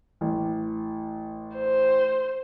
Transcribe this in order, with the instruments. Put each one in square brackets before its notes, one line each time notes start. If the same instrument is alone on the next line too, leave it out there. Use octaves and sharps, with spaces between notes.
[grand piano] A1
[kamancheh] C5